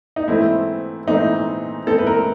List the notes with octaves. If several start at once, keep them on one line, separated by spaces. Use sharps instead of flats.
D#4
G#2 E3 A3 C4 E4
G#2 E3 A3 C4 D#4
G#2 E3 A3 C4 A4
B4
A#4